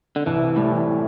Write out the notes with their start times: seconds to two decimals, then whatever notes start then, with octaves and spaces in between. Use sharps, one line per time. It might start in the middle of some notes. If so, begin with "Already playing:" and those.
0.16 D3
0.26 C2 E3
0.41 C3
0.56 A2 G3
0.71 E3